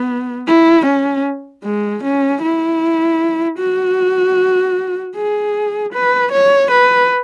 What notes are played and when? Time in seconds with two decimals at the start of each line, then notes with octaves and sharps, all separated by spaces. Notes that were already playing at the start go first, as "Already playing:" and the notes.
Already playing: B3
0.47 E4
0.86 C#4
1.64 G#3
2.03 C#4
2.42 E4
3.59 F#4
5.16 G#4
5.93 B4
6.32 C#5
6.71 B4